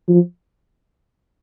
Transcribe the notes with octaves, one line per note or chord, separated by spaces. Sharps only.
F3